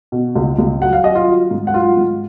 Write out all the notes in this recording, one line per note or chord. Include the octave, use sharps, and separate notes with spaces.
B2
C#2
C#2
F#3 F#5
F5
F#3 D#5
F4 F5
F#3
G#2
F#5
F#3 F4 F5
G#2